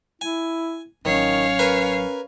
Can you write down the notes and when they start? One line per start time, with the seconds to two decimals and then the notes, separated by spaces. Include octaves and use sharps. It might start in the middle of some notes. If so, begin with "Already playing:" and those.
0.21 E4 G#5
1.05 A1 D#3 F#3 C#4 C#5 F5
1.59 A#4 B4 G#5